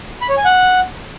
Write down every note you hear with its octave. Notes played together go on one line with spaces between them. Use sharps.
B5
C#5
G#5
F#5